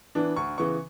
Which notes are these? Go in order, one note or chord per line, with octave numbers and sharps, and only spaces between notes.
E3 B3 D4
D2 C#6
C#3 E3 B3 C#6